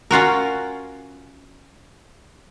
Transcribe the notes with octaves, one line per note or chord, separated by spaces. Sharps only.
C#4 F4 F#4 A#4